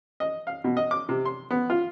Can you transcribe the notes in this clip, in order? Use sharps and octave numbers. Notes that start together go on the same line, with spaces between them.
D#5
F5
B2
D#5
D6
C3
C6
B3
F4